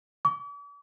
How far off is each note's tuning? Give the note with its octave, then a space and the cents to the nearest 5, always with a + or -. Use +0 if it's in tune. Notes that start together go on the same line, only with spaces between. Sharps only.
D6 -45